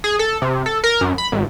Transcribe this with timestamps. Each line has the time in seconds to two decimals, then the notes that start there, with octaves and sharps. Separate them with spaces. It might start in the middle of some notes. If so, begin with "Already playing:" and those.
0.04 G#4
0.19 A4
0.42 C3
0.66 A4
0.84 A#4
1.01 F#2
1.18 B5
1.32 G#1